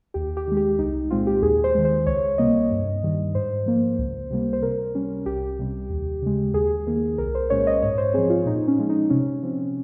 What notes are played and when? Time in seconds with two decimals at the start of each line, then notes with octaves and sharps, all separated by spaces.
0.14 D#2 G4
0.37 G4
0.47 D#3 G#3
0.57 G4
0.79 C2 D#4
1.10 A#2 G#3 C4 F4
1.27 G4
1.42 D#2 G#4
1.64 C5
1.75 D#3 G#3
1.85 C5
2.07 C#2 C#5
2.38 C3 G3 A#3 D#5
2.71 G2
3.03 D#3 G3
3.35 G#2 C5
3.66 F3 A#3
3.99 C#2
4.30 C3 G3 A#3
4.53 C5
4.62 C3 A#4
4.95 G3 C#4
5.26 C2 G4
5.59 C3 G3
5.90 D#2
6.22 C#3 G#3
6.54 D#2 G#4
6.87 D#3 A#3
7.18 C2 A#4
7.35 C5
7.50 A#2 G#3 C#4 C#5
7.67 D#5
7.82 G#2 C#5
7.98 C5
8.14 F3 C4 G#4
8.30 F4
8.46 A#2 D#4
8.68 C#4
8.79 F3 G#3 C#4
8.90 D#4
9.10 C3 C#4
9.43 F3 C4